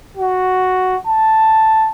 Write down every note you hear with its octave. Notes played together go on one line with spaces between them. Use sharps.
F#4
A5